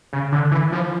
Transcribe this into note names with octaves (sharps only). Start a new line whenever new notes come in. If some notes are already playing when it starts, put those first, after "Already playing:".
C#3
D3
E3
F3